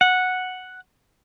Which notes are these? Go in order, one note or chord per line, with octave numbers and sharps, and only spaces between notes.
F#5